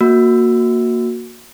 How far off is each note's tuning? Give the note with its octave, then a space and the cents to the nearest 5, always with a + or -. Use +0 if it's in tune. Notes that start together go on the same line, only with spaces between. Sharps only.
A#3 +0 F#4 -15 E6 +0